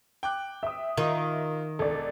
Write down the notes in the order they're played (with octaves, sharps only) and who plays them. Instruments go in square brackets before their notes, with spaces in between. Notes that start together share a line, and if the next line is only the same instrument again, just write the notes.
[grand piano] G5 D6 F#6
[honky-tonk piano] E5 D#6
[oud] D#3 [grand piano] F4
[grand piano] E1 [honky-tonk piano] A4 D5